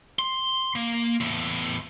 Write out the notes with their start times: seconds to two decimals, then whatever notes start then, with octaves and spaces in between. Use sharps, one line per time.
0.19 C6
0.76 A#3
1.21 E2 A2